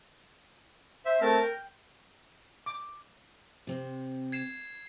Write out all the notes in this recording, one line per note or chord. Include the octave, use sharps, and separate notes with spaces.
C5 E5
A3 C4 A#4 A5
G5
D6
C3 C4
G#6 C7 E7